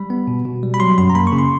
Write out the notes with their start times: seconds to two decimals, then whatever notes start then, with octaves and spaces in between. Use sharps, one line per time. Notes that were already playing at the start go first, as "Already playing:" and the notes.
Already playing: G3 B5
0.10 B3
0.27 B2
0.45 B2
0.63 G3
0.74 B5
0.80 F#3 C6
0.98 F#2 C6
1.10 A#5
1.15 A#3 B5
1.27 C#6
1.32 C#3
1.38 C6